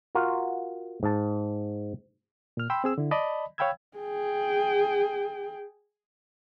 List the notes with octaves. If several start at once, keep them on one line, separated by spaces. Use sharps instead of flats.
F4 F#4 A#4
G#2 A5
A#2 F6
G5 B5 C6 E6
C4 G#4 E6
D3 E4
D5 D#5 A5 B5
C#5 F5 G5 B5 E6 G#6
G#4 G5